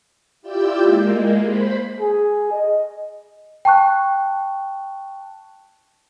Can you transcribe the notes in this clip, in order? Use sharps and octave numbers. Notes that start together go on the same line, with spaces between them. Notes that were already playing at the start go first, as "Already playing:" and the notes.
E4 F4 G4 D5 E6 G6
G#3 A#3
C5 B5
G#4
D#5
G5 A5 C#6 F#6